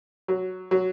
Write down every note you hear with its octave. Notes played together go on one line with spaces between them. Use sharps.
F#3
F#3